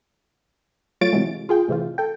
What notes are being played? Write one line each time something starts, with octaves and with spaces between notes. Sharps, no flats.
F#3 A3 F4 C#5 A6 D7
C3 E3 F#3 G#3
F4 G#4 G5
A2 C3 E3 F4
A4 G5